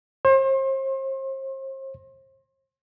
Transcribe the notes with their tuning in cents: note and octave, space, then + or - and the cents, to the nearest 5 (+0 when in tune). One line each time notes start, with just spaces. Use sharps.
C5 +40 C6 +35